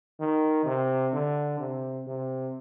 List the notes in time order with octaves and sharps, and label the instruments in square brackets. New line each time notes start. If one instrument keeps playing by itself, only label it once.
[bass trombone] D#3
C3
D3
C3
C3